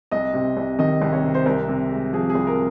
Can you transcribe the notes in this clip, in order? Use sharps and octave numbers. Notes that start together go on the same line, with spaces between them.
C2 D#5
C3
C2
D#3 D#5
C2
C#5
C3
C5
C2 A#4
C3
G#3
F3 G#4
G#4
C2
A#4